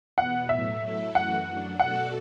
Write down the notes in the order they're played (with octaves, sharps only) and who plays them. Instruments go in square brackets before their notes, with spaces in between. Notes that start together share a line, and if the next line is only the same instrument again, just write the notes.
[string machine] E2 B2 B3 [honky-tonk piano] F#5
[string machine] A2 F#3 A3 [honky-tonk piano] E5
[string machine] F#3 A3 E4 A4
[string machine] F#2 E3 A3 F#4 [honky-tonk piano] F#5
[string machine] F#2 F#3 D4
[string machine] B2 A3 F#4 A4 D5 [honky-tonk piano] F#5